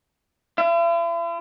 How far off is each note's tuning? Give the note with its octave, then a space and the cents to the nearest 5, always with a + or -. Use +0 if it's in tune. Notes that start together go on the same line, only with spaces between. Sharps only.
E4 +45 E5 +45